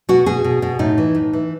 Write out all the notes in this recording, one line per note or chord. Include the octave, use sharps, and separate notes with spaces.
B2 F#4
B2 G#4
B2
B2
A2 D#4
E3
A2
E3